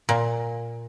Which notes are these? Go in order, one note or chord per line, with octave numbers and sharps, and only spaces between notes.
A#2